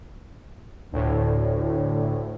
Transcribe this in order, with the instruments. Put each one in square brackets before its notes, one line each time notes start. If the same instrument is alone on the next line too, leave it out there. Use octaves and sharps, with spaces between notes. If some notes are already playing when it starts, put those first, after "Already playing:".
[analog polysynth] D2 A2